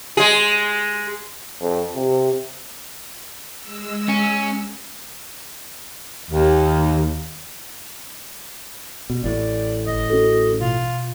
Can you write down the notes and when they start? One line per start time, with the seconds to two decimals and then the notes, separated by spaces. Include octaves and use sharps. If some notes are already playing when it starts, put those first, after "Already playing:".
0.17 G#3 G#4
1.61 F2
1.95 C3
3.62 G#3 E6
4.09 C#4
6.31 D#2
9.10 B2
9.24 A1 A2 D5
9.87 G1 D#5
10.10 C#4 F#4 A4
10.61 B2 F4